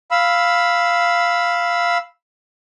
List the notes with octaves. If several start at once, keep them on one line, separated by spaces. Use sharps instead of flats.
F5 B5 E6